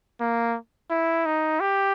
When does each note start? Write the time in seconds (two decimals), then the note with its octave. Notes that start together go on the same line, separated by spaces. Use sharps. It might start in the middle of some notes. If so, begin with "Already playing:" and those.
0.20 A#3
0.90 E4
1.26 D#4
1.60 G4